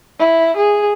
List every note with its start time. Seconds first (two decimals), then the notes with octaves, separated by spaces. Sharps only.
0.19 E4
0.56 G#4